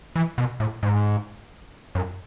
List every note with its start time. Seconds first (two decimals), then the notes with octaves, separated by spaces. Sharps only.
0.16 E3
0.38 B2
0.60 A2
0.83 G#2
1.95 F#2